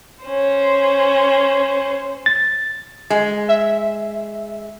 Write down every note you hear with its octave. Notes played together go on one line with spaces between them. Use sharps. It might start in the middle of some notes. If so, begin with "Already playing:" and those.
C#4 C5
A6
G#3
E5